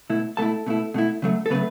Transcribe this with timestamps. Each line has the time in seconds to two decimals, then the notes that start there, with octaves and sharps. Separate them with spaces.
0.10 B2 A3 E4
0.37 B2 A3 E4 A4 A5
0.66 B2 A3 E4
0.94 B2 A3 E4
1.22 C#3 F#3 A3
1.46 A4
1.50 C#3 F#3 A3 B3 B4